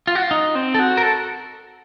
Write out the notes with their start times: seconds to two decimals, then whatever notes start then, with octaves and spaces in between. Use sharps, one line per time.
0.07 F4
0.15 F#4
0.22 F4
0.31 D#4
0.55 C4
0.75 A4
0.79 F#4
0.97 A#4
1.02 A4